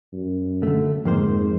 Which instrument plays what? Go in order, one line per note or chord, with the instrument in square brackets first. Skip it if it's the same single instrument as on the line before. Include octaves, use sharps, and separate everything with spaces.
[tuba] F#2
[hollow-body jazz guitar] D3 A3
[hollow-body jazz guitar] F2 A#3 C5 [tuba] G#2